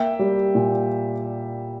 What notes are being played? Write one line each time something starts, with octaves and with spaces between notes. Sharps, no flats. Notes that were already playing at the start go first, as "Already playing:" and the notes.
Already playing: A#3 E5 G5
G3
A#2